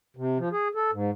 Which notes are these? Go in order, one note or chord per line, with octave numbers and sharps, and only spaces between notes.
C3
F3
G#4
A4
G#2